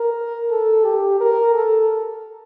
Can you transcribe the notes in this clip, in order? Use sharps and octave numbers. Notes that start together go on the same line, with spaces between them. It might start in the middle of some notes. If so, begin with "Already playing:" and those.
Already playing: A#4
A4
G4
A#4
A4